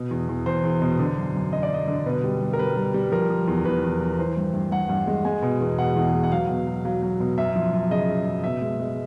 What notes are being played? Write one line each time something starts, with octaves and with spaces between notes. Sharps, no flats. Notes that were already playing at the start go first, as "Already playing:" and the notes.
Already playing: B2
E2
E2
E2 C5
E2
B2
D3
F#2
F#2
F#2 D#5
D5
F#2 D#5
D3
B2 B4
G3
G3
A#4
G3 B4
G3
G3
F3 A#4
F3
E2
E2 B4
E2
F3
E3 C5
G2
G2
G2 F#5
G2
G#3
G#3 G#5
B2
E2
B2 F#5
E2
G#3
F#5
F#3 F5
B2
F#3
F#3 F5
F#3
B2
F#2 E5
F3
F#2
C#3 D#5
C#3
F#2
B2 E5
G#3
G#3